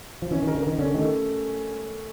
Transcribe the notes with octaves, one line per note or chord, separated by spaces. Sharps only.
F3
E3 C#4
D#3
A#4
D3
D#3 A#4
D3 C#4
D#3 A3